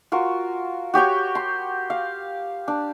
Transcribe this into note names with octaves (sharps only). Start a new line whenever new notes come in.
F4 F#4 A#4
F#4 G4 C#5 G5
C6
F5
D4